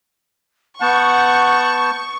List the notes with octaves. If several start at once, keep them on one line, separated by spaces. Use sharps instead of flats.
B3 F#5 A5 C#6 G6